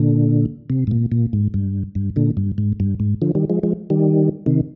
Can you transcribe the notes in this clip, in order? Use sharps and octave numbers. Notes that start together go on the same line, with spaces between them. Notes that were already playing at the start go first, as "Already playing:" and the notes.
Already playing: A#2 D3
C3
G#2
A#2
A#2
G#2
G2
G2
A#2 D3
G2
G#2
G2
G#2
D3 F3
D#3 G3
F3 G#3
F3 G#3
D#3 G3
C3 D#3